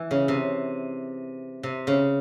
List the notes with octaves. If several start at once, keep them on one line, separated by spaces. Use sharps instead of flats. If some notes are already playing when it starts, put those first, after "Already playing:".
Already playing: E3
C#3
C3
C3
C#3